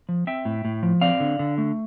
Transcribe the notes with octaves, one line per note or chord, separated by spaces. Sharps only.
F3
C4 E5 G5
A2
A2
F3
C4 D5 F5
D3
D3
A3